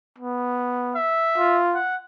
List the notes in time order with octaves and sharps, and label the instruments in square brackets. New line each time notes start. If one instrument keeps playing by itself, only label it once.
[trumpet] B3
[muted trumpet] E5
[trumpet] F4
[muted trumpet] F#5